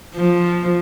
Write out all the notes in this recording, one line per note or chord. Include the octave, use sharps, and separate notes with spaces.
F3